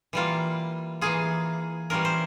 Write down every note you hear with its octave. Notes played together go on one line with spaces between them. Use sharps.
E3 G3 A#3 F4
E3 A#3 F4 G#4
E3 G3 C#4 F4 A#4
C5